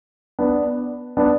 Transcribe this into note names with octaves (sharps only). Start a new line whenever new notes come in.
B3 D4
B3 D4